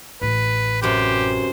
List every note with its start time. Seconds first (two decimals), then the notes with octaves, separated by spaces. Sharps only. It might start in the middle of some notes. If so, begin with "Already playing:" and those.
0.22 A1 B4
0.82 F#2 C3 G4 B4 C5